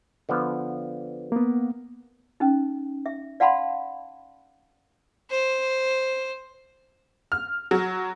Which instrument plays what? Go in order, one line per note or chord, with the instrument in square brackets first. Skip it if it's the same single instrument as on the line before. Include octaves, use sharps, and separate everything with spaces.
[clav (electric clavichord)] D3 F3 B3
[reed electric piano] A#3 B3
[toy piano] C#4 D#4
E5
D5 F5 F#5 A5 B5 C6
[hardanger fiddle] C5
[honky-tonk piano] F6
F#3